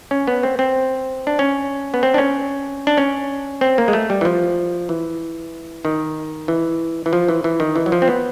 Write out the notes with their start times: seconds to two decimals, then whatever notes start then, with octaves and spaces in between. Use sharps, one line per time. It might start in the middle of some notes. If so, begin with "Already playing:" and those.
0.11 C#4
0.27 B3
0.43 C4
0.59 C4
1.27 D4
1.39 C#4
1.94 B3
2.03 C4
2.14 D4
2.18 C#4
2.87 D4
2.97 C#4
3.61 C4
3.78 A#3
3.88 G#3
3.93 A3
4.10 G3
4.21 E3
4.25 F3
4.89 E3
5.85 D#3
6.48 E3
7.06 E3
7.13 F3
7.28 E3
7.44 E3
7.60 D#3
7.76 E3
7.86 F#3
7.92 F3
8.02 C4
8.08 B3